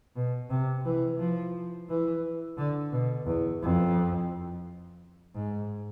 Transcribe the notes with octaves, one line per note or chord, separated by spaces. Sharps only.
B2
C3
E3
F3
E3
D3
B2
E2
F2
G#2